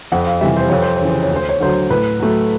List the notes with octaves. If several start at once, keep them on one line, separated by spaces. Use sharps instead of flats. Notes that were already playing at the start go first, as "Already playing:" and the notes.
F2 F#5
F5
C3 E3 G3 E5
C5
F2 C#5
C5
C#5
C#3 E3
C5
C#5
D2
C5
C#5
D3 F#3 C5
A2 B4
F#3 A3